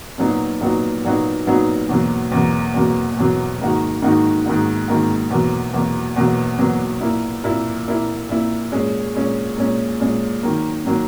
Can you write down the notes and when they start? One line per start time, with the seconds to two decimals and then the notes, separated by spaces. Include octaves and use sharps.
0.18 A#2 F#3 B3 D#4 F#4
0.61 A#2 F#3 B3 D#4 F#4
1.04 A#2 F#3 B3 D#4 F#4
1.47 A#2 F#3 B3 D#4 F#4
1.89 E2 B2 F#3 A#3
2.32 E2 B2 F#3 A#3
2.74 E2 B2 F#3 A#3
3.17 E2 B2 F#3 A#3
3.59 G#2 D#3 A#3 D#4 F#4
4.02 G#2 D#3 A#3 D#4 F#4
4.46 G#2 D#3 A#3 D#4 F#4
4.88 G#2 D#3 A#3 D#4 F#4
5.31 E2 B2 F#3 A#3
5.74 E2 B2 F#3 A#3
6.16 E2 B2 F#3 A#3
6.59 E2 B2 F#3 A#3
7.01 A#2 A#3 E4
7.44 A#2 A#3 E4
7.87 A#2 A#3 E4
8.29 A#2 A#3 E4
8.72 A#2 G#3 C#4
9.15 A#2 G#3 C#4
9.57 A#2 G#3 C#4
10.00 A#2 G#3 C#4
10.43 D#3 F#3 A#3
10.85 D#3 F#3 A#3